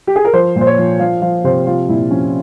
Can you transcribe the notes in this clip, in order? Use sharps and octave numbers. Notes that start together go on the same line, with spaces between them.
G4
G#4
A#4
F3 C5
A#2
C5
C#5
F3
F3 F5
F3 F5
C3 C5
F3 F4
A#2 E4
F3 C#4